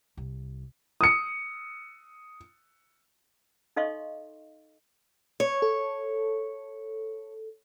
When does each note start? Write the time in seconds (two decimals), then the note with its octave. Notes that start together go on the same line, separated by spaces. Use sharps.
0.17 C2
1.01 D#6 C#7
3.76 D#4 A4 D#5 F5 C6 C#6
5.40 C#5
5.62 A4